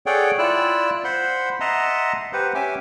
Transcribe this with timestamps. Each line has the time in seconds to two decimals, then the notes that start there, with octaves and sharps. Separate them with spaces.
0.06 G#4 A4 C#5 D5 F#5 G5
0.39 E4 F4 D5 E6 F#6
1.04 C5 F#5 B5 C6
1.60 D#5 E5 F#5 A5 A#5 C6
2.33 G4 B4 C5 F#5
2.55 C#4 G4 E5 G#5 D6